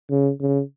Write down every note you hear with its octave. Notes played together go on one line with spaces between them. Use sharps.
C#3
C#3